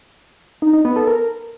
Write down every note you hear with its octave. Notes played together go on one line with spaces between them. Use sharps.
D#4
D#4
B3
A4
A#4